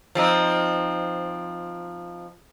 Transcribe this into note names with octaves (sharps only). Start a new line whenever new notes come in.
F3 C4 D#4